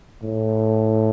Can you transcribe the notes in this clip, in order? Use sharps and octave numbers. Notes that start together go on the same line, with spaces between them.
A2